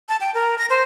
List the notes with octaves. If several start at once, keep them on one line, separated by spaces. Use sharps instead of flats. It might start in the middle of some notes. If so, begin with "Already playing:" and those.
A5
G5
A#4
A#6
C5